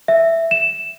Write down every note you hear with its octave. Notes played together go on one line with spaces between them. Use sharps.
E5
E7